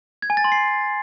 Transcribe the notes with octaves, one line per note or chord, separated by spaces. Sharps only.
G#6
G#5
A6
C6
C7